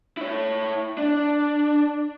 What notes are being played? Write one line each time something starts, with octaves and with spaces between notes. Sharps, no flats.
E4 C#5
D4